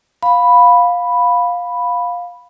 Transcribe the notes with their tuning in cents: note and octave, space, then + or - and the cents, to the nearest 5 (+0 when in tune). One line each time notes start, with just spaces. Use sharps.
F5 +15 B5 +0